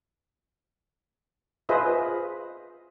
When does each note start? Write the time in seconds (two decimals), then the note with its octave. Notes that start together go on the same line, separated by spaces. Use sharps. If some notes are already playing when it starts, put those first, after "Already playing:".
1.69 F4 G#4 B4 C5 D#5 E5